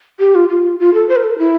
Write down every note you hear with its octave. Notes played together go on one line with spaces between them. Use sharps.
G4
F4
F4
F4
A4
C5
A#4
A4
A#4
E4